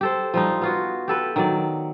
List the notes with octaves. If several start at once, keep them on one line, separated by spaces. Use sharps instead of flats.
G4 A4 C5
F3 G3 D#4
B3 F4 F#4
G4 A4 B4
D#3 F#3 D5